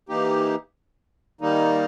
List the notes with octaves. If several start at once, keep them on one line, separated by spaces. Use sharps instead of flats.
E3 A#3 D#4 G4
D#3 G3 A#3 D#4